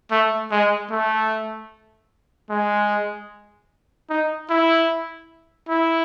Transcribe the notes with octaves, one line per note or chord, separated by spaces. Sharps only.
A3
G#3
A3
G#3
D#4
E4
E4